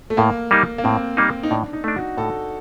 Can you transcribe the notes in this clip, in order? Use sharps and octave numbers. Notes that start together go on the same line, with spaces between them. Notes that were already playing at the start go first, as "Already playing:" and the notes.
A3
A2 A#3
G3 A#3 D#4
A#3
A2 C4
G3 A#3 D#4
D#4
A2 D4
D#4
A3 D4
F#4
A2 A4